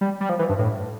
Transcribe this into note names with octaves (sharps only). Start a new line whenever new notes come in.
G3
G3
F3
E3
G2
A2